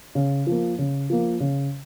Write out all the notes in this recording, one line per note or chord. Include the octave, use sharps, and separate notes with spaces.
C#3
F3 A#3
C#3
F3 A#3
C#3